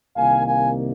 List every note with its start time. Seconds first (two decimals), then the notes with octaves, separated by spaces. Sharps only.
0.16 C2 C3 D#3 A#3 F5 G#5
0.46 F5 G#5